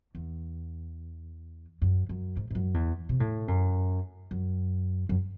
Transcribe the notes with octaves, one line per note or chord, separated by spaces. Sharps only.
E2
F#2
F#2
G#2
G#2
F#2
E2
C3
A2
F#2
F#2
F#2